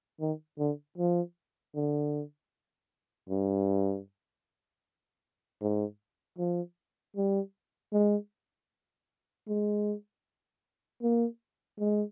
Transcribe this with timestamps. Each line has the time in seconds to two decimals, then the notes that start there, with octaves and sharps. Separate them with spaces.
0.21 D#3
0.59 D3
0.98 F3
1.75 D3
3.29 G2
5.61 G#2
6.38 F3
7.17 G3
7.93 G#3
9.48 G#3
11.03 A#3
11.79 G#3